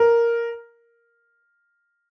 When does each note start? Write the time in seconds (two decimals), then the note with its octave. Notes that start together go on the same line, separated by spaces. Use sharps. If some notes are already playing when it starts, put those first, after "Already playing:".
Already playing: A#4